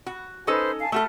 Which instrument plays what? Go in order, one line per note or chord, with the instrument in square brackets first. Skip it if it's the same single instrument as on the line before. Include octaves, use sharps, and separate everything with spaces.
[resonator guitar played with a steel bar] F#4
[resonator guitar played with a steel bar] C#4 D#4 A4 [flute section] B4 C5
[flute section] F5 G#5 A5
[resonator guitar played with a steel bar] A3 F#4 A4 [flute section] E5 F6